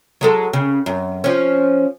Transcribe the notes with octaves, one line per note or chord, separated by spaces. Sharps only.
F#3 G#3 A4
C#3
F#2
F3 C#4